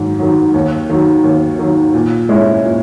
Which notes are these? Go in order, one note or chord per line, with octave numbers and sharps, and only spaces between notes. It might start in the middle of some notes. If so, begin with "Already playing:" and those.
Already playing: G#2 D#3 F#3
D#3 F#3
D#2
D#3 F#3
D#2
D#3 F#3
A#2
G#3 C#4 E4
A#2